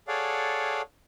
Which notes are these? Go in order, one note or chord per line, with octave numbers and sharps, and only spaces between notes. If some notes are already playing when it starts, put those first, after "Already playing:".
G#4 A4 C#5 D5 F5 F#5